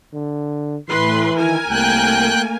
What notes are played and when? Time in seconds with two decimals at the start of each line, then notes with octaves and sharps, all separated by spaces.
0.13 D3
0.89 A2 E3 B4 C6
1.38 D#3 E4 A#4 G#5
1.69 C2 A3 A#3 G5 F#6